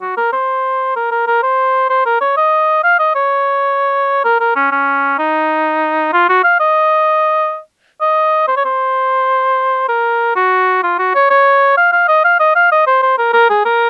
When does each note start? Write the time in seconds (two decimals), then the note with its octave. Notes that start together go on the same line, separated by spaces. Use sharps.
0.01 F#4
0.17 A#4
0.33 C5
0.96 A#4
1.11 A#4
1.27 A#4
1.43 C5
1.90 C5
2.06 A#4
2.21 C#5
2.37 D#5
2.84 F5
3.00 D#5
3.16 C#5
4.24 A#4
4.40 A#4
4.56 C#4
4.72 C#4
5.18 D#4
6.13 F4
6.29 F#4
6.44 F5
6.60 D#5
8.01 D#5
8.47 C5
8.57 C#5
8.65 C5
9.88 A#4
10.36 F#4
10.83 F4
10.99 F#4
11.15 C#5
11.30 C#5
11.77 F5
11.92 F5
12.08 D#5
12.24 F5
12.40 D#5
12.55 F5
12.72 D#5
12.87 C5
13.03 C5
13.18 A#4
13.33 A#4
13.50 G#4
13.65 A#4